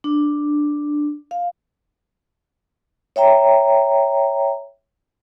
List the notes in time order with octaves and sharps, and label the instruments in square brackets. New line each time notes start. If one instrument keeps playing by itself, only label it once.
[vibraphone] D4
F5
C#5 E5 G5 A#5